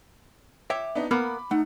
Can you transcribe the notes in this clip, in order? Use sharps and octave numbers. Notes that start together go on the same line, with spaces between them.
C#5 E5 G5 D6
B3 D4 D#4
A#3 B3 A#4 B5 D6
A3 D#4 F#5